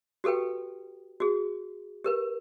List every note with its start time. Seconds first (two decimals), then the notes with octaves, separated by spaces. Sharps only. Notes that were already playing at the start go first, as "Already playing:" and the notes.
0.24 F#4 G4 A4 B4 G5
1.20 F#4 G#4
2.04 G4 A#4 B4